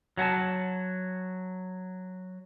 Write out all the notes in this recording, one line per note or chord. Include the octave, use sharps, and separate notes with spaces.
F#3 F#5 G#5 A5